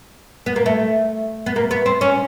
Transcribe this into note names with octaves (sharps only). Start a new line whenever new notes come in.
B3
A#3
A3
B3
A#3
B3
C4
C#4